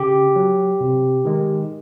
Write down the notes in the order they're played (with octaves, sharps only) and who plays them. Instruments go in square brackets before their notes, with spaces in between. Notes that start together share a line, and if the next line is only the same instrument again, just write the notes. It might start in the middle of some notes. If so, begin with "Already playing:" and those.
Already playing: [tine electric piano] C#3 G4
F#3
C3
D#3 G#3